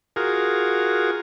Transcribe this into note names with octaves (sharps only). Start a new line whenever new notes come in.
F4 F#4 G#4 A#4